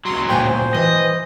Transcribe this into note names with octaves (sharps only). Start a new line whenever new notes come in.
C#2 F#3 C6
D2 A#2 G5 G#5
C5
E3 D#5